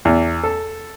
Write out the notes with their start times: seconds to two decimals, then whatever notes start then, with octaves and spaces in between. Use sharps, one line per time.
0.05 E2
0.43 A4